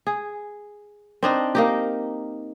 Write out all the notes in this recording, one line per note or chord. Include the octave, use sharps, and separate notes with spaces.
G#4
C4 D4 D#4
A#3 D#4 G4